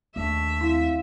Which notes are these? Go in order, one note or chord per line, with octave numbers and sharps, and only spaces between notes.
D#2 A3 D4 E5 A5 C#6
C4 E4 F5